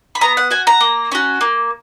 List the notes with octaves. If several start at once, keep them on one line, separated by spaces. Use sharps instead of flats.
B5
B3 A#5
F#5
F#4 G#5
A#5
A#3
C#4 F#4
A#3